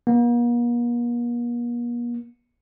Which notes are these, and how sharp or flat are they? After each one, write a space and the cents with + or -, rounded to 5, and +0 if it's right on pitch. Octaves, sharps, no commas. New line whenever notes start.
A#3 +45